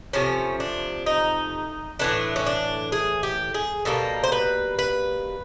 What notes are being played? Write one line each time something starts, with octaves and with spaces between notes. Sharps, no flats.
C3 F3 A3 C#4
D4
D#4
A2 E3 A3 D4
C#4
D4
G#4
G4
G#4
B2 G3 A#3 A4
C5
B4
B4